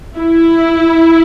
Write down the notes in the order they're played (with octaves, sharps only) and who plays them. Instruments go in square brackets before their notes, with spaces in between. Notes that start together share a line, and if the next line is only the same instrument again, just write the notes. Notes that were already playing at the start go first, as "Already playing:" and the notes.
[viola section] E4